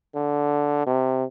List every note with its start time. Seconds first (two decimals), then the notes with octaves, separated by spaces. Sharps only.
0.15 D3
0.87 C3